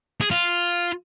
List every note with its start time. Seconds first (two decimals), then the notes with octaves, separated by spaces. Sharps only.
0.21 G#4
0.31 F4